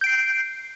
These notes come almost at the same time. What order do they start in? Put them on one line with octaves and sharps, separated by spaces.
G6 D7 C7